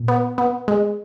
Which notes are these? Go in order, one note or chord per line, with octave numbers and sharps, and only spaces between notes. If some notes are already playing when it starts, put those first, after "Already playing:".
Already playing: A#2
B3
B3
G#3